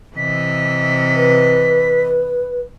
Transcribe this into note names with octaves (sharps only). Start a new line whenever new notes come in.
C3 E3 D#5 B6
B4